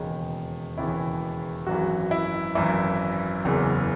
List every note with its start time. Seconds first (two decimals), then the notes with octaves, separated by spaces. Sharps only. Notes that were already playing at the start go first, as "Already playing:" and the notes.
Already playing: E1 D#2 C#3 E3 D#4
0.78 E1 D#2 C#3 E3 E4
1.67 G#1 F#2 E3 F#4
2.11 E4
2.55 G#1 F#2 E3 E4
3.45 F#1 E2 C#3 E3